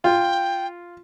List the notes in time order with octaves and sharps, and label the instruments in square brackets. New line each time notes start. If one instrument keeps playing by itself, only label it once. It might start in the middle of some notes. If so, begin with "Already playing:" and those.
[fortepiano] F4 [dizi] G5